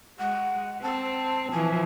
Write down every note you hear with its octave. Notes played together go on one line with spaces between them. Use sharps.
G#3 F#5
C4 A5
E3 F3 G#5